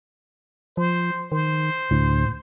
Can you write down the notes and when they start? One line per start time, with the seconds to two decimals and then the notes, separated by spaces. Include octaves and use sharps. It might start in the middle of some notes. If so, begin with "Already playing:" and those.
0.77 F3 C5
1.32 D#3 C5
1.91 D2 A2